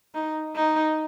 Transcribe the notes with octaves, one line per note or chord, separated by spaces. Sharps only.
D#4
D#4